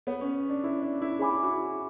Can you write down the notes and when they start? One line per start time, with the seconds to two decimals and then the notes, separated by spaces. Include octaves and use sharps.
0.07 B3 G#4 C#5 F#5
0.21 C#4
0.49 D4
0.64 E4
0.82 D4
1.02 E4
1.19 E4 G#4 C#5 G#5 B5 D6
1.43 F#4
1.48 E4